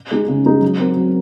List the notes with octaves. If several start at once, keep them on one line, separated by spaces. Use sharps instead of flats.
G#3 D#4 G#4
C#3
G#3 D#4 G#4
F#3
C4 F#4 A#4
F#3